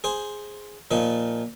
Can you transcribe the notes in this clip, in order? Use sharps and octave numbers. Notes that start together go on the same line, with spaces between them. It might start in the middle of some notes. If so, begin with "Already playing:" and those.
G#4 C5
A#2 F3 D#4